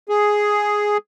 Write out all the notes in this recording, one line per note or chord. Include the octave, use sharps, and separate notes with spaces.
G#4